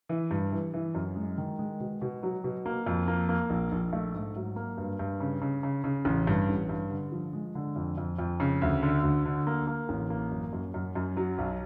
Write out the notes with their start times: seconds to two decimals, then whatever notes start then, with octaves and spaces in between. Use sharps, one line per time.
0.09 E3
0.31 G2
0.52 E3
0.74 E3
0.95 F#2
1.16 G#3
1.38 D#3
1.59 G#3
1.80 B2
2.01 B2
2.23 F#3
2.44 B2
2.66 A#3
2.86 F2
3.08 A#3
3.29 A#3
3.50 A#1
3.72 A#1
3.93 A3
4.14 G#2
4.35 F#3
4.56 A#3
4.78 G2
4.99 G2
5.20 C#3
5.42 C#3
5.63 C#3
5.84 C#3
6.05 A1
6.27 G2
6.49 A1
6.69 G2
6.91 D3
7.12 F3
7.33 G#3
7.55 D3
7.76 F2
7.98 F2
8.19 F2
8.40 C#3
8.62 D2
8.83 D3
9.03 D2
9.25 D3
9.47 A#3
9.67 A#3
9.89 A1
10.10 A#3
10.31 F#2
10.53 F#2
10.74 F#2
10.95 F#2
11.17 F#3
11.38 B1